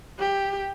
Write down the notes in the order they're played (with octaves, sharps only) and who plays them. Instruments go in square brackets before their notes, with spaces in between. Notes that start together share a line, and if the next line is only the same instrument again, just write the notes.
[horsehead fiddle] G4